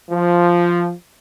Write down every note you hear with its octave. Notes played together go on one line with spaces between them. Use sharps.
F3